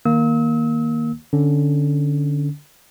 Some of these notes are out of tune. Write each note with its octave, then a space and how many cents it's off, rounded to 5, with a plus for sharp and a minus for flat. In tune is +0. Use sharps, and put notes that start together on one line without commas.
D#3 +0 A#3 +0 E6 -40
D3 +0 C#4 +0